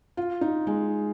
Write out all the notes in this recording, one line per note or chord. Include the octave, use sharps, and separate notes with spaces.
F4
D#4
G#3